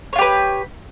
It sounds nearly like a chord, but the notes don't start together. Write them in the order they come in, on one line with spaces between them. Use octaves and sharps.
C#5 F4 G4 B4